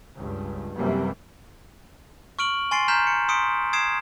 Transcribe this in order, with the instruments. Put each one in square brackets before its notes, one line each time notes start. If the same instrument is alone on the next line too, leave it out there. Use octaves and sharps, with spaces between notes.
[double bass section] C#2 G2
F#2 C3 E3 G3 A#3
[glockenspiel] C#6 F6 D7 F#7
G#5 C6 A6 C7 D7
A#5 F6 G6 B6 E7
C#7
C6 D#6 B6 C#7 D7
D#6 G#6 C7 D7 E7